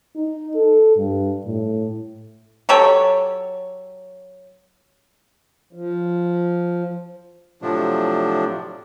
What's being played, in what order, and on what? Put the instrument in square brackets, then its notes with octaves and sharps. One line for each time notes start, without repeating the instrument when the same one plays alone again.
[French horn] D#4
A4
G2
A2
[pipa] F#3 G4 A4 C#5
[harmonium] F3
[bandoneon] A2 C3 F3 F#3 D4